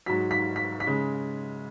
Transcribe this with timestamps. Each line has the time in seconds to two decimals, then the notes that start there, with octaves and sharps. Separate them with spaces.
0.06 G#2 F#3 B6
0.31 B6
0.56 B6
0.80 B6
0.87 C#3 G#3